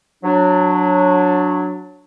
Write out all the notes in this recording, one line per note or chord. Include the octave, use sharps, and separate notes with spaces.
F#3 D4